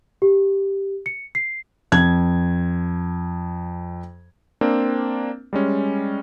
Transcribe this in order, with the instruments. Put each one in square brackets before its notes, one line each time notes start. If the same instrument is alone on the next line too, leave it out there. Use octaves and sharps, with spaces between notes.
[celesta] G4
C#7
C7
[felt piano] F2 G#6
[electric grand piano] A#3 C4 D4
G3 G#3 C#4